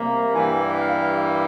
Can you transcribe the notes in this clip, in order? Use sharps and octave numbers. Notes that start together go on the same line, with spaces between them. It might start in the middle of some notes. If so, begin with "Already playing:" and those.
Already playing: C3 G3 A#3
G2 E3 G3 A#3 G#5
F5